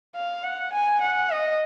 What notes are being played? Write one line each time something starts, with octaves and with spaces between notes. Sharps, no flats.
F5
F#5
G#5
F#5
D#5